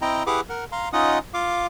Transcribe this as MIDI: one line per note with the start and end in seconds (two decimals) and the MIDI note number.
0.02 0.23 60
0.02 0.23 64
0.02 0.23 75
0.02 0.23 79
0.02 0.23 82
0.27 0.41 64
0.27 0.41 67
0.27 0.41 68
0.27 0.41 71
0.27 0.41 78
0.27 0.41 86
0.49 0.64 70
0.49 0.64 78
0.72 0.89 77
0.72 0.89 82
0.72 0.89 84
0.93 1.19 61
0.93 1.19 63
0.93 1.19 65
0.93 1.19 75
0.93 1.19 78
0.93 1.19 87
1.34 1.67 65
1.34 1.67 77
1.34 1.67 86